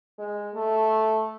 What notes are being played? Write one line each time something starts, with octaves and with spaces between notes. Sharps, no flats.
G#3
A3